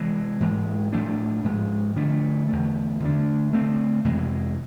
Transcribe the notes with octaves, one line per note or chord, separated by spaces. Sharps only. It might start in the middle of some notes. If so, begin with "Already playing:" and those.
Already playing: C3 E3 G#3
G#2 E3 G#3
A2 F3 A3 D4
G#2 F3 G#3
D3 F3 A3 D4
E2 D3 A3
D3 A3 D4
D3 A3 C4
F2 C3 E3 G#3